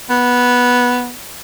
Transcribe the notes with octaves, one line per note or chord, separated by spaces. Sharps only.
B3